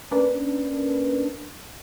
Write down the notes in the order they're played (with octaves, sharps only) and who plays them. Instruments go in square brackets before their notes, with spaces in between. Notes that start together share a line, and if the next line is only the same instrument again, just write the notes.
[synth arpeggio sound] A#3 C#4 D4 A#4 B4